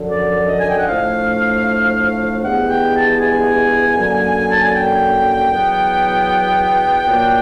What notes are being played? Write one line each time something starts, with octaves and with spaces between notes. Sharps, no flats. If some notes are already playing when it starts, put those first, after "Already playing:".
Already playing: F#2 D3 F3
D5
D#5
G#5
G5
F#5
A2 F3 A3 D4 F5
G2 E3 G#3 B3 F#5
G5
A5
G#5
F#2 D3 F#3 A#3
A5
G#5
G5
E2 B2 F#3 B3
A#2 F#3 A#3 D4